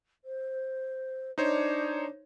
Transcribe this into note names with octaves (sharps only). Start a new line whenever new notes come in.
C5
D4 D#4 C5 C#5